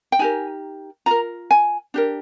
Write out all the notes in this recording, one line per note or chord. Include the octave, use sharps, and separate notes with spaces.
G5
D#4 G4 A#4 G#5
F4 A#4 A#5
G#5
D4 G4 A#4